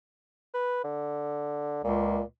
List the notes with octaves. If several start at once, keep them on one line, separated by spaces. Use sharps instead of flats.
B4
D3
C#2 A#2